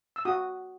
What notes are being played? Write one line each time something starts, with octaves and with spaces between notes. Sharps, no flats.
E6
F#4 D#6